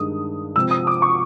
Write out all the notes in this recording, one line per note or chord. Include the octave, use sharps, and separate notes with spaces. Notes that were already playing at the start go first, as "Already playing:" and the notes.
Already playing: G2 D#3 G#3 D#6
C3 F3 G#3 C4 E6
D#6
D6
C#6